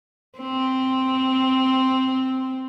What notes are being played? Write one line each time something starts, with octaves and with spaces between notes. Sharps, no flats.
C4